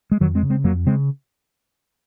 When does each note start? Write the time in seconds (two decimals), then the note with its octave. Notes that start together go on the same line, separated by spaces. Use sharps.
0.12 G#3
0.20 F2 D#3 F#3
0.35 G#3 C4
0.43 C#3
0.50 G#3 C4
0.64 F2 F#3 A#3
0.86 C#3 G#3 C4